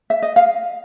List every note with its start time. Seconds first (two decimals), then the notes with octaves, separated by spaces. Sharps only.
0.10 E5
0.22 D#5
0.36 F5